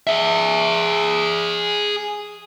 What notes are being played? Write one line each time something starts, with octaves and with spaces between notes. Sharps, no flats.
G#4 E5